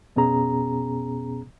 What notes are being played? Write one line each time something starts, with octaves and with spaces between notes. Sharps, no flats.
F2 B2 B3 C#4 G#4 A#5